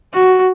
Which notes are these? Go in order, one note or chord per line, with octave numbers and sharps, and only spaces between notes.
F#4